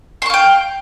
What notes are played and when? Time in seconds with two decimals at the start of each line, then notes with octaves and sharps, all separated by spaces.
0.22 C6
0.26 C#6
0.30 F5
0.34 G5